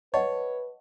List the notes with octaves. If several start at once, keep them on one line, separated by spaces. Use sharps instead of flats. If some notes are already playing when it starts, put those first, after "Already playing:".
B4 C#5 D#5 F#5 A5